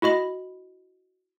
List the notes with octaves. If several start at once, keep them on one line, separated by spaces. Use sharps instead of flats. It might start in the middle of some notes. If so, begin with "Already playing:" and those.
E4 F#4 D#5 B5